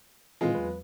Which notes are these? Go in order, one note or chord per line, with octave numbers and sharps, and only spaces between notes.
A#2 D#3 E3 G#3 F4
E2 F#3 B4